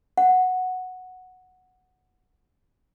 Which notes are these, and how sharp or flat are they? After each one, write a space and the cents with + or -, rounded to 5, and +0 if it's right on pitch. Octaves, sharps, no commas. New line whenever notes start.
F#5 -5